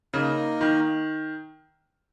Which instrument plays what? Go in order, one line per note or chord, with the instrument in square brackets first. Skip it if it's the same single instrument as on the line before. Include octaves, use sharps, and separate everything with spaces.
[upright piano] C#3 [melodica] A#3 D#4 A#4
[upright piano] D#3